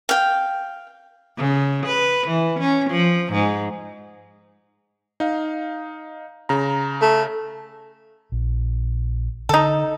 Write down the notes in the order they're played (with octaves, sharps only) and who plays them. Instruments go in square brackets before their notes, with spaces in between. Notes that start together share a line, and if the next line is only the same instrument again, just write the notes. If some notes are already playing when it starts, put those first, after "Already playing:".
[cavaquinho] F5 G5
[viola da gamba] C#3
B4
E3
C#4
F3
G#2
[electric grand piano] D#4 F5
C#3 A#5
[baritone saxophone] A3
[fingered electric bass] A#1
[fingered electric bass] D3 [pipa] D#4 A4